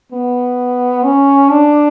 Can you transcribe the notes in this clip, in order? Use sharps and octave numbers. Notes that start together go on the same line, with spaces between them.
B3
C#4
D4